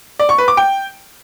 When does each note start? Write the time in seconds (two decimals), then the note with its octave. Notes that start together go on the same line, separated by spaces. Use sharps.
0.19 D5
0.29 C#6
0.38 B4
0.48 D6
0.57 G5